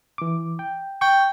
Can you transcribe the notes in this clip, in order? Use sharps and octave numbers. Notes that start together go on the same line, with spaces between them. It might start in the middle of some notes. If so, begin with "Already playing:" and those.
E3 D6
G5
G5 C#6